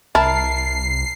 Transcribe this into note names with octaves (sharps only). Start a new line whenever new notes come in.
C2 E4 A#4 A5 C7